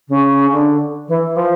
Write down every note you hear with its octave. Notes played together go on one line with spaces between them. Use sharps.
C#3
D3
E3
F3